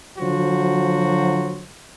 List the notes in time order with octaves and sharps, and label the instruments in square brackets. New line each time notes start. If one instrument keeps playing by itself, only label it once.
[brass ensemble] D3 F3 F#3 F#4 C5